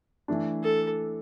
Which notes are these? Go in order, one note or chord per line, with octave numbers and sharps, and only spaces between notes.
E3 A3 D4
A4